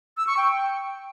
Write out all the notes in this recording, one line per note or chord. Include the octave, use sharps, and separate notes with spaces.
E6
C#6
G5